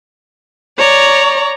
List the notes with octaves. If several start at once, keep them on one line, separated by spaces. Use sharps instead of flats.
C#5 D5 A#5